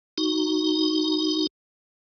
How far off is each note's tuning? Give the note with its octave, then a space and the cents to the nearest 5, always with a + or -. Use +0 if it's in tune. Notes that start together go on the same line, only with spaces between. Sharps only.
D#4 +0 F#4 +0